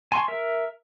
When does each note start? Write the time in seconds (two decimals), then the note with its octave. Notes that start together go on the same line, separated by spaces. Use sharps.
0.12 G#5 A5 C6 C#6
0.28 A#4 E5